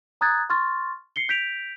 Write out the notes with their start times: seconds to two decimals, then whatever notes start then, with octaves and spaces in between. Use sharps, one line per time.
0.21 A#5 D#6 F#6 G#6 A6
0.50 C6 C#6 F6 A6
1.16 C7 C#7 G7
1.29 G6 B6 D7 F7